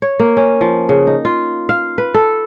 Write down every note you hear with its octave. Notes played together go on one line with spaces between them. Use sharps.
C#5
A#3
C#4
F3
C#3
D#4
F4
F5
B4
A4